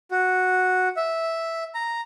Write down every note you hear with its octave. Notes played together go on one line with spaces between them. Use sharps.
F#4
E5
A#5